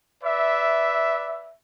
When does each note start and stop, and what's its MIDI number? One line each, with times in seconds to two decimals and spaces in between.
0.24 1.53 71
0.24 1.53 74
0.24 1.53 76